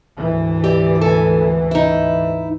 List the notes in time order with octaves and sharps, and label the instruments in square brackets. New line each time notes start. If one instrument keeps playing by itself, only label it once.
[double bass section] G#1 D2 E3
[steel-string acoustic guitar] G4 D5
A4 G#5
D#4 E4